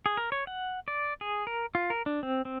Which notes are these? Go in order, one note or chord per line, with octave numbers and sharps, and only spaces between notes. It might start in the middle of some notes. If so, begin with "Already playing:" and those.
G#4
A#4
C#5
F#5
D5
G#4
A#4
F4
A#4
D4
C4
C4